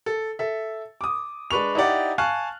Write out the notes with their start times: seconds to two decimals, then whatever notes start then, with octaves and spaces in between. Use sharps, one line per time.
0.06 A4
0.39 A4 E5
1.01 D6 D#6
1.51 G#3 D4 B4 C#6 F7
1.75 D#4 E4 G4 D5 F#5
2.18 F5 G#5 A5 C#6 F6 F#6